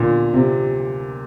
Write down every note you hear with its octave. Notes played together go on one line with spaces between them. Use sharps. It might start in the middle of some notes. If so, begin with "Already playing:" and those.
Already playing: A#2 D3
C3